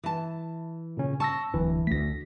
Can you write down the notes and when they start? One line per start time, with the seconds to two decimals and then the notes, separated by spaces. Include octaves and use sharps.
0.04 E3 A5
0.97 A#2 C#3 C#4
1.20 A5 C#6 E6 A#6
1.54 D1 E3
1.87 D2 A3 A#6 B6